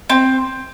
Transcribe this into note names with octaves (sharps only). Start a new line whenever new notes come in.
C4